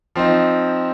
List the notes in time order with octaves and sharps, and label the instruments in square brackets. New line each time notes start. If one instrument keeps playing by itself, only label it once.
[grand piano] F3 C4 D#4